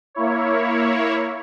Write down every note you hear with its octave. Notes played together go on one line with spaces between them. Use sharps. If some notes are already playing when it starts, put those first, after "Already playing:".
A#3 E4 C#5